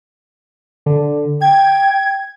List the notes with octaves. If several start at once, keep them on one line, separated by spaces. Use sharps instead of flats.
D3
G5 G#6